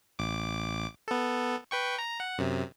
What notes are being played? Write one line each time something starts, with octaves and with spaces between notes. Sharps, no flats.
A1 D6
B3 A4
B4 G5 C#6
A#5
F#5
F#2 C3